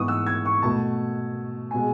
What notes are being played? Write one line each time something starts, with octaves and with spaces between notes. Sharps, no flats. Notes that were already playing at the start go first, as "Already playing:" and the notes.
Already playing: G#2 E3 B3 C#6 D#6
E6
G#6
C#6
B2 A3 A5
B2 G#3 G#5